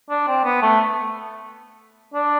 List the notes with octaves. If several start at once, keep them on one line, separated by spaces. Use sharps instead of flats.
D4
C4
B3
A3
D4